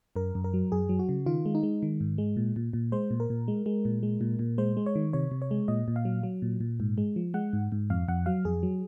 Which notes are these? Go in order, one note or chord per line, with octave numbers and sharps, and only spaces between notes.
F#2 A#4
F#2
A#4
F#3
F#2 G#4
F#3
F#4
C#3
D#3 F4
G#3
D#4
G#3
D#3
G#2
G#3
A#2
A#2
A#2
G#3 C5
A#2
A#4
A#2
G#3
G#3
A#2
G#3
A#2
A#2
G#3 C5
G#3
C#5
D#3
C3 C#5
C3
C#5
G#3
A#2 D#5
A#2
F5
F#3
F#3
A#2
A#2
G#2
G#3
F3
G#3 F#5
G#2
G#2
F2 F5
F2 F#5
F#3 F5
F2 G#4
F#3